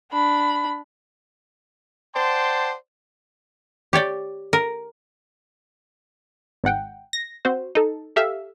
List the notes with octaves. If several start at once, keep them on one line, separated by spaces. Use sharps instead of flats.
D4 B5
C5 D5 F#5 G5 A5 C6
G4 C#5 D5 G5
A#4
G#1 G#2 F#5 G5
A#6
C4 F#4 C5
D#4 A4
G4 A4 E5 F5